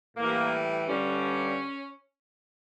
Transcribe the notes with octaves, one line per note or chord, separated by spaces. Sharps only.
A2 E3 G3 A#3
G2 D3 G3 C#4